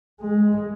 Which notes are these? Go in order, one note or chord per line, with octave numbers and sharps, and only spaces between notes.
G#3